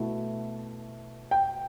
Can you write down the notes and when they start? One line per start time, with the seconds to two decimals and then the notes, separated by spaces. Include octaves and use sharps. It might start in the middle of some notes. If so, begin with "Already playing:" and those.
Already playing: B2 A3 E4
1.31 G5